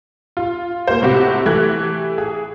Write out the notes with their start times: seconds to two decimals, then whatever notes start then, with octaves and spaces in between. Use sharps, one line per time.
0.37 F4
0.88 A#3 C5
1.02 A2 C3 F#4 G4
1.46 E3 A3 G4 F#6 G#6
2.18 G#4